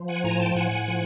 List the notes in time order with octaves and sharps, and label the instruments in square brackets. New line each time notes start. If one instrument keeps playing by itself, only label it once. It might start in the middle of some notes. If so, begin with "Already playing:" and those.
Already playing: [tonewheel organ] F3
F#5 G#5
A2 G#5 A#5
G5 A5
A2 F#5 G#5
F3